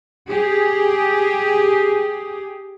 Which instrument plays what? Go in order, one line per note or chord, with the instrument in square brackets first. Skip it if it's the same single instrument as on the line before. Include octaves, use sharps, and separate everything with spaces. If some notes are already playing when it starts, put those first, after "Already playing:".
[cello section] G4 G#4